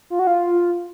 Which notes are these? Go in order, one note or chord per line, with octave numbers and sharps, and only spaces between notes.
F4
F#4
F4